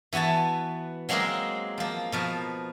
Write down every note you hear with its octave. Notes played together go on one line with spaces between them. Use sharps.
E3 B3 F#4 G#5 A5
F#3 G#3 A#3 C4 G#4 A#4
F3 A#3
B2 F3 A#4